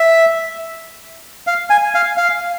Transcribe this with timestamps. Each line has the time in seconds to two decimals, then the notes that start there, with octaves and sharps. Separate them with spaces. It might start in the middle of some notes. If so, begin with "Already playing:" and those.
Already playing: E5
1.47 F5
1.70 G#5
1.94 F5
2.17 F5